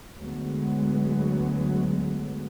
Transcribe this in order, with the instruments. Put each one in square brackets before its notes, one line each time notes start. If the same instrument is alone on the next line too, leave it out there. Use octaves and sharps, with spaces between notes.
[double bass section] D2 F#3 G#3 B3